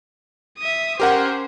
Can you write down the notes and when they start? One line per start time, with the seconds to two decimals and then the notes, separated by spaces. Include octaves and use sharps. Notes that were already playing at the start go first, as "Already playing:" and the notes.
0.58 E5 D#6
1.00 C#4 G4 A#4 C5 F#5